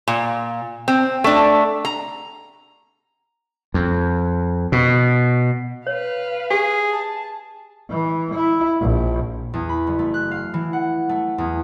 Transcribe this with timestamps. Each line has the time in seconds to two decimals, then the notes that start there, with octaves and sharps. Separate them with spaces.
0.08 A#2
0.88 C4
1.24 A3 D4
1.85 A#5
3.74 F2
4.72 B2
5.87 B4 C#5 F5
6.51 G4 G#4
6.91 A5
7.90 E3
8.35 E4
8.81 A#1
9.54 E2
9.69 B5
9.87 F#1
9.99 A3
10.14 F#6
10.31 F5
10.54 E3
10.73 F#5
11.09 A3
11.38 E2